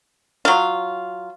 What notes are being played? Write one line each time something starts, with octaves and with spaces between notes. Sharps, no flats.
F#3 F4